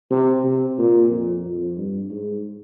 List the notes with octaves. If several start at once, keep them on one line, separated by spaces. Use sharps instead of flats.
C3
C3
A#2
F2
F2
G2
G#2